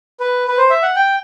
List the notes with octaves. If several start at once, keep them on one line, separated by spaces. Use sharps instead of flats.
B4
B4
C5
E5
F#5
G5